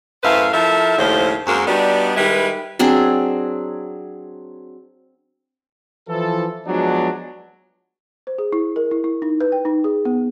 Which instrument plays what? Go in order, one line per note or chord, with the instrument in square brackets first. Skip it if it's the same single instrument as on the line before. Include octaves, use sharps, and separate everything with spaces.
[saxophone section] F#2 A2 B4 C5 E5 F5
F3 E4 A4 A#4 E5
D#2 A2 C#3 F3 A3 C5
F#2 G#3 A#3 C4 F#4 A#4
G3 B3 D4 D#4 F#4 D5
D#3 G3 G#3 E4 B4
[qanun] F#3 C4 D4 G#4
[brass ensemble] E3 F3 A4
F3 F#3 G#3 B3 D4
[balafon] C5
G#4
E4
A#4
E4
E4
D#4
B4
G5
D#4
G#4
B3